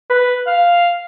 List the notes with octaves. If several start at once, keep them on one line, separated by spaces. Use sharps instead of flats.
B4
F5